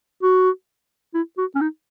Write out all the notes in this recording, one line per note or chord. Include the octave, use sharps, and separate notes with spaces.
F#4
E4
F#4
C#4
D#4